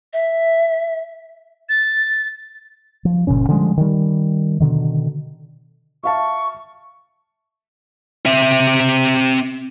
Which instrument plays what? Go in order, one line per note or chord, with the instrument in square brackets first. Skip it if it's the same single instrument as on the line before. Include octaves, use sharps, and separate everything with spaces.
[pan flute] E5
[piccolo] A6
[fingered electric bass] F3
F#1 A#2 C#3 C#4
D3 F3 G3 G#3
D#3 G3
B2 D3 D#3
[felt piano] E5 F5 A5 [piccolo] C#6
[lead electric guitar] C4 E5